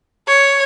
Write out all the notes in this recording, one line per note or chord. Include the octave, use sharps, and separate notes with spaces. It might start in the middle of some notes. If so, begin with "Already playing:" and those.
C#5